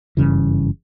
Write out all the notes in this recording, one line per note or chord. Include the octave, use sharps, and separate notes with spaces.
F#1 G2 C#3 E3